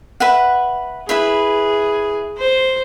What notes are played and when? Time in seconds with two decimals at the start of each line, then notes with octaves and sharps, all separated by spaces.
0.20 B4 E5 F#5
1.09 E4 G#4 B4 E5
2.38 C5